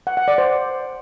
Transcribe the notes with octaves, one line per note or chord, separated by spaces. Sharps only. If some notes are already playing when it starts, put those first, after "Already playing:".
F#5
F#5
D5
C5